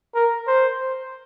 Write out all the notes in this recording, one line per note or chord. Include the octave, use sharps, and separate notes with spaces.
A#4
C5